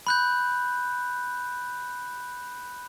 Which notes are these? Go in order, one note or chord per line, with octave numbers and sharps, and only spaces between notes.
B5 F#6 G6